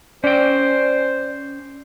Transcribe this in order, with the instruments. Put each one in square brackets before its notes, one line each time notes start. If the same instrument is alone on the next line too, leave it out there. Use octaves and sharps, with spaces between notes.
[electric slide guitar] C#4 G5 [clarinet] C5 [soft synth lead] D5